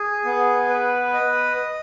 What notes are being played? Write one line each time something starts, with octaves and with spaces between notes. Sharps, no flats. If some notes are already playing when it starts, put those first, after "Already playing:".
Already playing: G#4
B3
B4
D#5